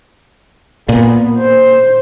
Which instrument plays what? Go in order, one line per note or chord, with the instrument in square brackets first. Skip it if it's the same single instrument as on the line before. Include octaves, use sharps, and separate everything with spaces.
[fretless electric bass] A#2 [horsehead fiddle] B3
[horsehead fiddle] C5